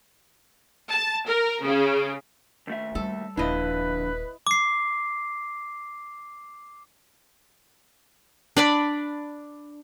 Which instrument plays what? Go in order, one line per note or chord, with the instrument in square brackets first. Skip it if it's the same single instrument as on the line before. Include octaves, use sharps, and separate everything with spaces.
[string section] A5
A#4
C#3
[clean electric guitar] D#2 A3 E5
[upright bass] G3 [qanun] A4
[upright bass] D#1 [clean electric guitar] D3 F3 [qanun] E4 D#5 [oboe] B4
[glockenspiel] D6 C7
[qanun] D4 D5 B5